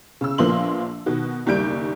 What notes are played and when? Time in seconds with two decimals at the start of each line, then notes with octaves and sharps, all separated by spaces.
0.21 C#3 E6
0.38 A#1 F3 A#3 B3 C6 F#7
1.06 B2 D#3 F#4
1.46 F#1 D#2 G3 G6 D7